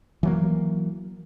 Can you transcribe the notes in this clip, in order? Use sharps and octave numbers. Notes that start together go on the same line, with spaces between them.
E3 F#3 A#3